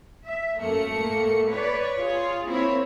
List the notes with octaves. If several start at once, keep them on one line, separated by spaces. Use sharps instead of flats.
E5
F#2 A3 A#3 C#7
A2 A#3
B4 C#5 D5
F4 G#4
A#3 C4 E4 C#5